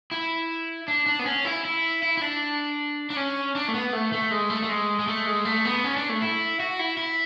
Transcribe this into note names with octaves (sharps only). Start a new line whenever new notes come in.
E4
D4
D4
B3
C#4
E4
E4
E4
E4
D4
D4
C#4
D4
A3
B3
A3
A3
G#3
A3
A3
G#3
G#3
A3
G#3
A3
B3
C#4
D4
A3
E4
F#4
E4
E4